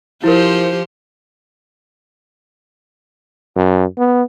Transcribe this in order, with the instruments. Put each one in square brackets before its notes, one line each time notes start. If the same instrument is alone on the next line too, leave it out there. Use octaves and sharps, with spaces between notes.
[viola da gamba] F3 G4 C5 [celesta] E4 A#4
[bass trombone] F#2
B3